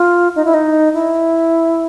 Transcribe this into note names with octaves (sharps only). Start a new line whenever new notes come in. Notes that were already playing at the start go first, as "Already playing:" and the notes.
Already playing: F4
D#4
E4
D#4
E4